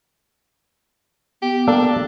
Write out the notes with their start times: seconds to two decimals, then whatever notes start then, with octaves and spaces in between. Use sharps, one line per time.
1.42 B3 G4
1.68 A#3 D4 A4 D5